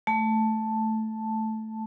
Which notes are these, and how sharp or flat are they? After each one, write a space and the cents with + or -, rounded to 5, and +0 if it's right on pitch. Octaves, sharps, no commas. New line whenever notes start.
A3 -5 A5 +0